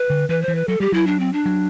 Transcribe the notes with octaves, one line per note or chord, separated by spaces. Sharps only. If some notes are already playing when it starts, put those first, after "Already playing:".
Already playing: B4
D3
E3 B4
C5
E3
B4
F#3 A4
G3 G4
F#3 E4
D4
C4
D4
F#3